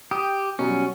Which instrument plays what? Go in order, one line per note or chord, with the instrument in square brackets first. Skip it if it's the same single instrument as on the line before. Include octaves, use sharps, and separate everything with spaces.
[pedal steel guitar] G4 [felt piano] D#6
[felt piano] B2 F#3 G3 [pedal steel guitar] C#4